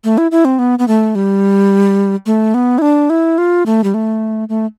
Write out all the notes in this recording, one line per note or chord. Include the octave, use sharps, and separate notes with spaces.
A3
E4
E4
C4
B3
B3
A3
G3
A3
B3
E4
D4
E4
F4
A3
G3
A3
A3